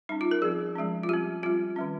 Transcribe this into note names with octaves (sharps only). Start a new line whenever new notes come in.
G3 C#4 D#4
F4
A#4
F3 C4 G#4
F3 G#3 C#4
F4
G3 C4 G4
G3 C4 F4
D#3 G3 C#4